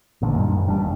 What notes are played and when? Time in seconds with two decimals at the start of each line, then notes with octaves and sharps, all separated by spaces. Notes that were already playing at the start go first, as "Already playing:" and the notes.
0.22 A1 A#2 D3
0.36 F#2 A#2 D#3 G3
0.56 G#2
0.67 E1 E2 G3 D4
0.80 F1 D#2